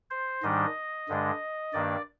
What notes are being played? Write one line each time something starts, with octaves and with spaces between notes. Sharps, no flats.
C5
G#2 D#3 G3 D4 D#5
G2 D3 G#3 D4
G2 D#3 A#3 D4 D5